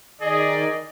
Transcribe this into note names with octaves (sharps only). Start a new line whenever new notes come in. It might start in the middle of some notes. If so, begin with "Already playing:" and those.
D#3 G#4 D5 D#5